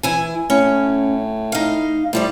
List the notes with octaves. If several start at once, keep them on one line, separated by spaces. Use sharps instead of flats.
E3 E4 G#5
A2 C#4
D#4 F5
A2 F3 G3 D5